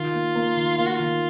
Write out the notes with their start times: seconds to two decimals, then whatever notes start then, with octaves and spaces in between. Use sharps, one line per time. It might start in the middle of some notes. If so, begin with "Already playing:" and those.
Already playing: D#3 F4
0.14 A#3
0.35 A#3
0.57 D#3
0.78 A#3 F4
0.86 F#4
0.94 F4
1.00 D#3